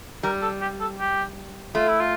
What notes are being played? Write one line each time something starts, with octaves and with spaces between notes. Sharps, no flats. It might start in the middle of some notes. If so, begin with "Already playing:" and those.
G3 A#4
A4
G4
A4
G4
A3 F4
E4
F4